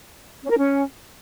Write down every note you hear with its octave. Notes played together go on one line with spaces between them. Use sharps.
C#4
A#4
C#4